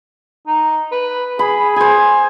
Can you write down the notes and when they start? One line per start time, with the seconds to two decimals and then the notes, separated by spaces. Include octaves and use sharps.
0.47 D#4
0.92 B4
1.39 G#4 B5
1.76 G#4 C5 G#5